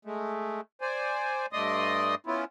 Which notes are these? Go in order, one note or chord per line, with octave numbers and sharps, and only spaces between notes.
G#3 A3
C5 D5 G#5
G2 A3 D5 D#5 C6 D#6
B3 C#4 E4 F4